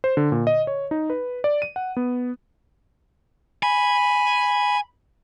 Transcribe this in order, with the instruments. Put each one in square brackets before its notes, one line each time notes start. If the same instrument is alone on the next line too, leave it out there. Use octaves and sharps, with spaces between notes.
[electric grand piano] C5
D3
A#2
D#5
C#5
D#4
B4
D5
D#7
F#5
B3
[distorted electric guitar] G#5 [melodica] B5